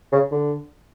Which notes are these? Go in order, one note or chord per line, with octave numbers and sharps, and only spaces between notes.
C#3
D3